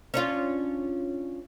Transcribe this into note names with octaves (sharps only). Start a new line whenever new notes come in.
C#4 D4 F4